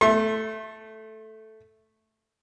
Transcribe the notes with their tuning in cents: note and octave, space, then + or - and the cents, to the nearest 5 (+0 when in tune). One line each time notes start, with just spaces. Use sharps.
A3 +0 C6 +45